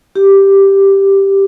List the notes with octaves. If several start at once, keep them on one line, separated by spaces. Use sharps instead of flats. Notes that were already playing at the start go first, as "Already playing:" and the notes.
G4